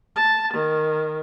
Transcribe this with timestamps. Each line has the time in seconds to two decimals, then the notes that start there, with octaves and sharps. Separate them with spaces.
0.16 A5
0.54 D#3